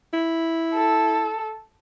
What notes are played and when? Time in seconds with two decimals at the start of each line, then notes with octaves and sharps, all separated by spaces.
0.14 E4
0.74 A4